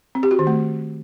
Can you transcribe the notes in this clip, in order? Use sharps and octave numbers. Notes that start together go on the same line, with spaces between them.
C4
G4
F#4
D#3
A3